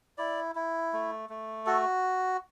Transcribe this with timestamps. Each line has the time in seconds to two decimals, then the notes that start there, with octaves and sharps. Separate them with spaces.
0.18 E4 D5
0.55 E4
0.93 A3
1.30 A3
1.66 F#4 A4